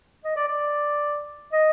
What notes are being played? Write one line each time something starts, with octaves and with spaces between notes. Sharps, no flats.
D#5
D5
D5
D#5